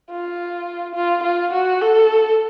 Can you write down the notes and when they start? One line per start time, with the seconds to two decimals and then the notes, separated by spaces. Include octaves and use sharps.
0.11 F4
0.95 F4
1.23 F4
1.53 F#4
1.81 A4